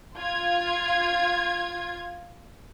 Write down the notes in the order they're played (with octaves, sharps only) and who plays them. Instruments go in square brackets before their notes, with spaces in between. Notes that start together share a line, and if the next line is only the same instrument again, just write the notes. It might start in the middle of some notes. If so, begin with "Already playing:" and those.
[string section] F4 G#6